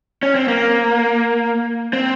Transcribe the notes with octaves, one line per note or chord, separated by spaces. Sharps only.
C#4
C4
A#3
C4